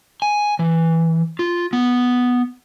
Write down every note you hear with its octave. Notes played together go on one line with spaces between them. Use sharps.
G#5
E3
F4
B3